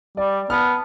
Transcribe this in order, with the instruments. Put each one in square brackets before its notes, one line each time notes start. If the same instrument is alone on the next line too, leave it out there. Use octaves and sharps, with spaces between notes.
[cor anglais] G3 [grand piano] D5
[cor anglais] B3 [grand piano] A5 F6